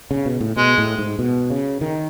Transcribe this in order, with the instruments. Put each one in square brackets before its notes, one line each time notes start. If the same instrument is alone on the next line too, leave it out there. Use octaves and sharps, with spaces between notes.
[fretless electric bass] C#3
B2
A2
[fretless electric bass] B2 [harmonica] G#3
[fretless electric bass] A2
G#2
B2
C#3
D#3